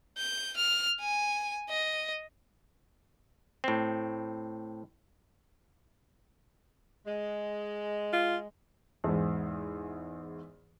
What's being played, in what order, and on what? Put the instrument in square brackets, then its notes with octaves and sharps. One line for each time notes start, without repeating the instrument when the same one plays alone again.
[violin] G6
F6
G#5
D#5
[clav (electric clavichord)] A2 C4
[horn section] G#3
[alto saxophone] F4
[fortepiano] E2 G#2